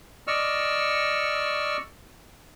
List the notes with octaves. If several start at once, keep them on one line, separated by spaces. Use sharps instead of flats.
D5 D#5 C#6 E6 F6